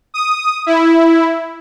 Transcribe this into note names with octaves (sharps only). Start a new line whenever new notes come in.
D#6
E4